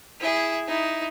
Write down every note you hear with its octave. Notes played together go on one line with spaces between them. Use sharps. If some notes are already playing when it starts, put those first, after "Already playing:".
E4 G#4
D#4 E4